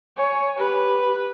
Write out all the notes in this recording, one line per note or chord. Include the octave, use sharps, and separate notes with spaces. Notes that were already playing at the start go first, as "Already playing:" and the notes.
C#5 G#5
G4 B4